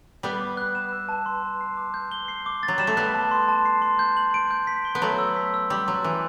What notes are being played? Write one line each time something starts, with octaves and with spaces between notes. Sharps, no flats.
G3 B3 C7
D6
F#6
E7
E6
A5
C6
A5
C7
D6
G6
G7
C7
D6
A6
F#3
G3 E7
A3
G3 B3 F#6
A5
C6
A5
C7
C6
G6
F#7
D7
G6
B6
G7
B3
F#3 A3 F#7
E6
B6
E6
G3 A6
F#3 C6
E3 F#6